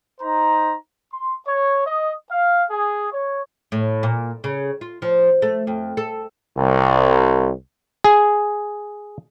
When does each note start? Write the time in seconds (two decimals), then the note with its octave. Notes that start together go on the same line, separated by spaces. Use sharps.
0.21 D#4 C5 A#5
1.13 C6
1.48 C#5
1.87 D#5
2.31 F5
2.71 G#4
3.13 C#5
3.72 A2
4.03 A#2
4.44 C#3
4.81 F4
5.02 F3
5.42 A3
5.67 F2
5.97 A4
6.58 C2
8.04 G#4